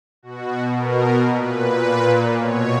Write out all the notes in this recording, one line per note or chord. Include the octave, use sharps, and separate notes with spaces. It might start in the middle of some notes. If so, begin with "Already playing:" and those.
B2 F#4
A#4
A#2 B4
B2 C#5